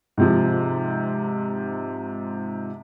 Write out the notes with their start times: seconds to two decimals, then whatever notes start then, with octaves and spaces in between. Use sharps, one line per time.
0.18 G#2 C3 F3